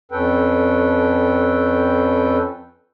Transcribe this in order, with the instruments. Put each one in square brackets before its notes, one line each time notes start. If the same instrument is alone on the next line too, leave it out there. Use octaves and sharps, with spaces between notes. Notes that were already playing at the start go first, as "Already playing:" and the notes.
[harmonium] F2 C#4 A4 B4 G5